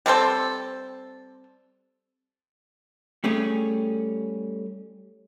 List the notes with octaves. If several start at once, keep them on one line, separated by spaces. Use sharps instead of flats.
G3 C4 A4 C5
G3 A3 C#4 G4 G#4